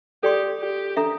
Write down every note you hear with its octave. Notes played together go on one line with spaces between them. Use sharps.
G4 A4 D5 G5 C6
G4
D4 A4 E5 A#5